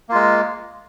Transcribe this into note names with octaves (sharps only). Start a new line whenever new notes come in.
G#3 A#3 F4